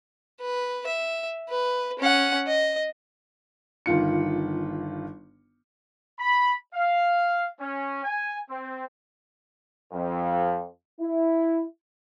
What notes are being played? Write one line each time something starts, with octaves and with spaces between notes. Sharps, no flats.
B4
E5
B4
C#4 F#5
D#5
G1 D#3 F4 C#7
B5
F5
C#4
G#5
C4
F2
E4